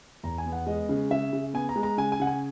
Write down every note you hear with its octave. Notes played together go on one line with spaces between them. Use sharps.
E2 A#5
G#5
B3
F#5
G#3 D#5
C#3
C#3 E5
C#3
B3 G#5
A#5
G#3
A#5
C#3 G#5
G#5
C#3 F#5
G#5